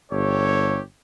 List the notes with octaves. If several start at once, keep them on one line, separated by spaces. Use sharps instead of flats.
G1 G4 A4 C#5